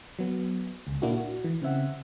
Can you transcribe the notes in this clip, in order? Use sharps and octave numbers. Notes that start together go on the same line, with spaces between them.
F#3 B3
C#2
A#2 A#3 D4 E4 F#4
F#4
E3
C#3 C4 E5 F#5